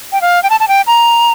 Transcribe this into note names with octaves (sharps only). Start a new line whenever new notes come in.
G5
F5
G5
A5
A5
G5
A#5